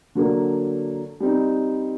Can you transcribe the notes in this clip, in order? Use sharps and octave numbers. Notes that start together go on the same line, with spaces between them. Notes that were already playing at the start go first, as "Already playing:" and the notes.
D3 F#3 A#3 D4
G3 C4 D#4